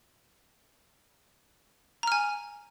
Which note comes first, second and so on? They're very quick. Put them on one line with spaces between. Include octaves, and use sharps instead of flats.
A#5 F6 G#5